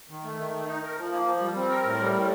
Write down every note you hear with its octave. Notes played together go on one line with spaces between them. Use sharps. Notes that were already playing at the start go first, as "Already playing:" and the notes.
D#3
A3
D#3
A3
D#4
A#4
F3
A#3
F3
G3
C4
A#4
A2
G3
A2